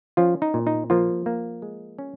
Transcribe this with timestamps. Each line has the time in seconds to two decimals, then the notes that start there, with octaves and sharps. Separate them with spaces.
0.17 F3 C#4 F4
0.42 D#4
0.54 A#2
0.67 D#4
0.90 F3 A#3 F4
1.26 A#3
1.62 G#3
1.99 C#4